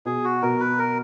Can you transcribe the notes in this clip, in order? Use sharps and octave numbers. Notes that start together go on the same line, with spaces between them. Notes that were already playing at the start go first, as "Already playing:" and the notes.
B2 G#4
F#4
B2 A#4
B4
A#4